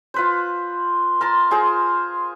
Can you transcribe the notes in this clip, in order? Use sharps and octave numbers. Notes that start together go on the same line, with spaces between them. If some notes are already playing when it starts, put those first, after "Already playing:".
F4 B4 C5
A#4 A5 C6
F4 G#4 A#4 C5